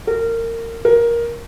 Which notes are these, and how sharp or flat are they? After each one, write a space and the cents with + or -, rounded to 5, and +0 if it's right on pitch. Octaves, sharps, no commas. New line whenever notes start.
A#4 -25
A#4 +10